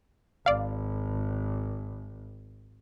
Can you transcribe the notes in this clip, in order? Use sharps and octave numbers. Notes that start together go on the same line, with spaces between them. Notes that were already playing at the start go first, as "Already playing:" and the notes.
G#1 D5 F5